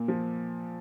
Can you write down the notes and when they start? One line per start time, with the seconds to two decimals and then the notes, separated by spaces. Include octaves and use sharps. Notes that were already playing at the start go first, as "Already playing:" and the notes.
Already playing: A#2 A#3
0.08 F3